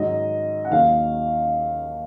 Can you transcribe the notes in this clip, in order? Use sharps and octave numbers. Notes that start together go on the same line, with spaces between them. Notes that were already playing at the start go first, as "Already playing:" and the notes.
Already playing: G#2 D#3 F#3 D#5
F#5
D#2 D#3 F#3 F5